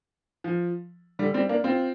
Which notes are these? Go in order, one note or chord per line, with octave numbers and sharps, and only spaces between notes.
F3
D3 G3
G3 C4
A#3 D4
C4 F4